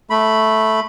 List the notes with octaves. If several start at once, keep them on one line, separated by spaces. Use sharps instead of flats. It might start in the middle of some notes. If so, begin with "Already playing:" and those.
A3 B5